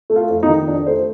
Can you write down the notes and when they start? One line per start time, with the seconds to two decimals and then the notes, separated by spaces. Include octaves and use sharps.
0.10 A3
0.16 F4
0.30 F2
0.43 D#4
0.48 D#3
0.67 F2 D4
0.86 A3 C5